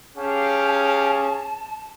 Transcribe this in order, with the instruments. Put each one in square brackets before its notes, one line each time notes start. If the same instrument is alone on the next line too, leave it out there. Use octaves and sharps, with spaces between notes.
[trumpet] C#4 [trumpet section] G4 F5 [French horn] G#4 [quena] A5